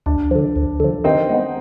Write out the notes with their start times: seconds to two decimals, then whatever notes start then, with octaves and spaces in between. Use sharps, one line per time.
0.06 D2 D4
0.31 D3 F3
0.56 D2
0.80 D3 F3
1.04 D#3 C4 D#4
1.30 G#3 B3